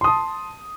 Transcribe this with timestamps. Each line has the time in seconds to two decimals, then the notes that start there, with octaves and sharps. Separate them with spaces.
0.01 C6
0.04 D#6
0.08 A5